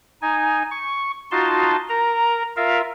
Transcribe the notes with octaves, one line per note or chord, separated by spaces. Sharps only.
D#4 G#5
C#6
D#4 F4 F#4 A5 C6
A#4 A#5
F4 A#4 E5 F5